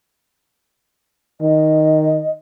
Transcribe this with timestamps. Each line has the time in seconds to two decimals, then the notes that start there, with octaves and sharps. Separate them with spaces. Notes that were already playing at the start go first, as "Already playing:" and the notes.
1.41 D#3 D#5